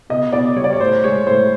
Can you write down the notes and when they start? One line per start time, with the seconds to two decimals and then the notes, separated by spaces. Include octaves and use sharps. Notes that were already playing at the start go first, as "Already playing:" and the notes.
0.10 B2 D#5
0.33 B2 D5
0.56 G3 C#5
0.64 D5
0.73 C#5
0.80 A2 C5
1.04 G#3 C#5
1.27 A2 C5